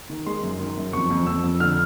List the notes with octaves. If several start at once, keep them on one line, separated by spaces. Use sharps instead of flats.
D#3
G#3 C6
F#2
D#3
F#2
F2 C#6
F2
F2 E6
F2
D3 F6